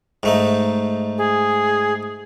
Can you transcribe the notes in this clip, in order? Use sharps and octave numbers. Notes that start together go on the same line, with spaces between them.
G#2 A3 D#4
G#4